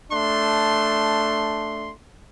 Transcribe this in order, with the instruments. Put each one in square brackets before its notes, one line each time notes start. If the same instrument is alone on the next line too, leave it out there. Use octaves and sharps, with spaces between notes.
[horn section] A3 D4 C6